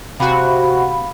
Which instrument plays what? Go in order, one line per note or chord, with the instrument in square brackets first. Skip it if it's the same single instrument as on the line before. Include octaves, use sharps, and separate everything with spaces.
[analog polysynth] C3 F#4 [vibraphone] F5 B5